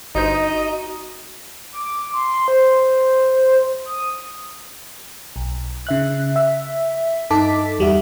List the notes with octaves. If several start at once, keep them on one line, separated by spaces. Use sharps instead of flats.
G1 D#4 F#4 C5 D#5
D6
C6
C5
D#6
B1
C#3 E5 F#6
E5
G2 D#4 A4 A5 D6 B6
E2 G3 F#4 E5